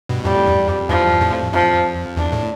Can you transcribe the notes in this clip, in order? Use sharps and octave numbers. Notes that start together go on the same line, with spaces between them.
G2 B2
F2 A2 G3
E2 G2
F2
E2 G2 F3
F2 A2
F2 F3
E2 D4
A2